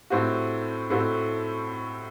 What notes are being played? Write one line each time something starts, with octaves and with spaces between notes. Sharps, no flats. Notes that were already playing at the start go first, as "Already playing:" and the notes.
A2 A3 C4 F#4
A2 A3 C4 F#4